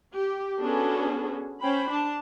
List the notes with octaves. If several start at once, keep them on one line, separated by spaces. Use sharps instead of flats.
G4
B3 C#4 D4 F#4 G#4 A4
C#4 C5 G5 B5
D4 A5